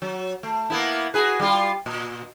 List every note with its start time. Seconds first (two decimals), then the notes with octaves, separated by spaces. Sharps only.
0.02 F#3
0.43 A3
0.70 A#3 B3 E4
1.14 F#4 G#4 B4
1.40 G3 F4
1.86 A#2